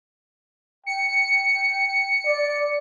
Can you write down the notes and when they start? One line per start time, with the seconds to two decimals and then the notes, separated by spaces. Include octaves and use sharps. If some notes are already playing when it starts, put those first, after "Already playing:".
0.86 G5 C#7
2.26 D5